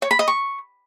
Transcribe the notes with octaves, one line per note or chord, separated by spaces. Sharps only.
C#5
B5
D#5
C#6